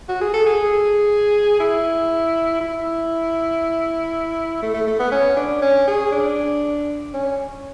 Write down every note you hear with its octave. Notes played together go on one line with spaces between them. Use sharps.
F#4
G#4
A4
G#4
E4
E4
A3
A3
A3
B3
C#4
D4
C#4
G#4
D4
C#4